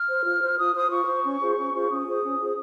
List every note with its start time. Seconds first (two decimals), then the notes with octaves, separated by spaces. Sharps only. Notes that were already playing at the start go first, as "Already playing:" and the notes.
Already playing: F6
0.09 C5
0.25 F4
0.42 C5
0.58 F4 D#6
0.75 C5 D#6
0.90 F4 C#6
1.07 C5
1.24 C#4
1.40 F4 G#4 C5
1.57 C#4
1.73 F4 G#4 C5
1.90 C#4 D#6
2.06 F4 G#4 C5
2.23 C#4
2.40 F4 G#4 C5